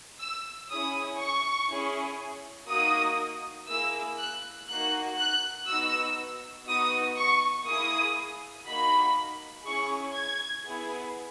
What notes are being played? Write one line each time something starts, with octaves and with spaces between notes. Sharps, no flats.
E6
C#4 E4 G#4 D#6
C#6
C#4 E4 G#4
A#3 D#4 F#4 D#6
A#3 E4 G#4 E6
F#6
A#3 D#4 F#4 F#6
F#6
B3 D#4 F#4 E6
B3 D#4 F#4 D#6
C#6
A#3 E4 G#4 D#6
A#3 D#4 F#4 B5
C#4 E4 G#4 C#6
G#6
B3 E4 G#4